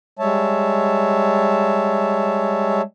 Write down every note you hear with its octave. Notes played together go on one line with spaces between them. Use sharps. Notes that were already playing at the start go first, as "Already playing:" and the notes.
G3 G#3 C#5 E5 A5